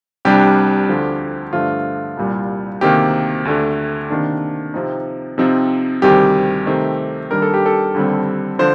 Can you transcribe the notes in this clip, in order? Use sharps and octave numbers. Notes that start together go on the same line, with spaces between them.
C2 C3 G3 D4 G4
D2 D3 F3
G2 D3 F3 A3 F4
C2 A#2 G3
D2 C3 D#3 A#3 G4
D2 D3 A3
C3 D#3 A#3 D4
C3 F3 C4 D#4
C3 F3 C4 D#4
D2 C3 D#3 G3 G4
C3 D#3 A3 C4 D#4
D#2 D#3 G3 D4 A#4
A4
G4
A4
D#2 D3 G3 C4
D3 F3 C5